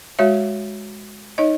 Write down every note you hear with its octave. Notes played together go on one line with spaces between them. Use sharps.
G#3 F#4 C#5 E5
D#4 C#5 D#5